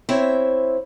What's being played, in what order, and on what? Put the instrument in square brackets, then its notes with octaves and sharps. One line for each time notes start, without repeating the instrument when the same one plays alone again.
[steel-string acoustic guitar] C4 E4 C5 C#5 E5